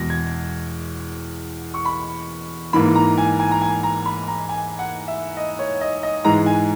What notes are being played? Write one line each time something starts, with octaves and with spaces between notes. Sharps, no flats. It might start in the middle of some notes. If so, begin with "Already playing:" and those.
Already playing: E2 B2 G#3 A#6
G#6
C#6
B5
G#2 E3 A#3 B5
A#5
G#5
G#5
A#5
G#5
A#5
B5
A#5
G#5
F#5
E5
D#5
C#5
D#5
D#5
G#2 E3 G#3 A#5
G#5